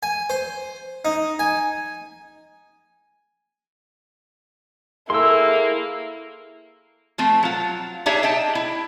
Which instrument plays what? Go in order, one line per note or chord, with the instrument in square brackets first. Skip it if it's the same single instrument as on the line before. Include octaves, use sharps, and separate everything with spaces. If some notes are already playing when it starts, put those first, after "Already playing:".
[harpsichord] G#5
C5
D#4
G#5
[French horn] A#3 [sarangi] E4 [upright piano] G#4 A4 [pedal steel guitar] C6 E6
[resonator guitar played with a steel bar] F3 A3 C4
F#3 F4
D4 D#4 G4 G#4 C#5 E5
D#5 G5 A5
E4